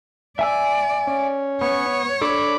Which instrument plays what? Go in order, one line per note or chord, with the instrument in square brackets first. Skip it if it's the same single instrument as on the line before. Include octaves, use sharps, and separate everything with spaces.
[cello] D5 [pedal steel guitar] E5 G#5 E6
[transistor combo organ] C#4
[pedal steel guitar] B3 [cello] C#5
[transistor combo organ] D4 B5 D6 [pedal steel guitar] A4